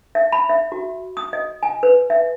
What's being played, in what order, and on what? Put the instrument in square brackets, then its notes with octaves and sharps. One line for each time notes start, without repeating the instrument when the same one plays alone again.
[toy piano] E5
B5
E5
F#4
D#6
D#5
G#5
B4
E5